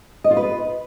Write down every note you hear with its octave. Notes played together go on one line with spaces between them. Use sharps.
D#5
F4
B4